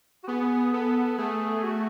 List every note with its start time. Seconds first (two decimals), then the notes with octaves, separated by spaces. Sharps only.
0.23 F#4
0.28 B3 G#4
0.73 B3 A4
1.18 A3 G#4
1.63 F#4